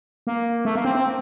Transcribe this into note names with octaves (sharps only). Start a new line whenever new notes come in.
A#3
A3
A#3
C4
C4